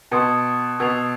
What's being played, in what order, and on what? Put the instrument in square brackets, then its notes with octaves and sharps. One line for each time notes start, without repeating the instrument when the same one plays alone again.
[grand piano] B2 [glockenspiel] A5 C6 D#6 G#6 C#7
[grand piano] B2 [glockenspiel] E6 G#6 C7 F7